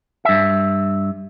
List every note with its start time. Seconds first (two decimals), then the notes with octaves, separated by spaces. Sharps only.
0.25 G2 E5